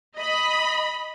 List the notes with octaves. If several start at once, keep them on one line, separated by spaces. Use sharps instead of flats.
D#5 B5